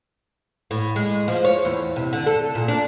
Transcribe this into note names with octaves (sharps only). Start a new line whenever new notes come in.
A2
G#3
F3
C#5
E2
C3
D3
A4
A#2
D4